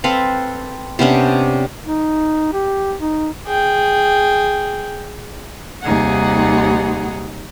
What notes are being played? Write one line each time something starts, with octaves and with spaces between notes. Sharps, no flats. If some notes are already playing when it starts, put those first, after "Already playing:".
C4 A4 B4 F5
C3 B3 C#4 D4
D#4
G4
D#4
G#4 G5
D#2 C3 G3 D#4 G#4 F#5